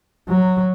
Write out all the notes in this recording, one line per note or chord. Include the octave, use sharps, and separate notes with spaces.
F#3